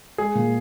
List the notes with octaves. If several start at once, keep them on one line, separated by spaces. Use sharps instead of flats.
G#3 G#4
A#2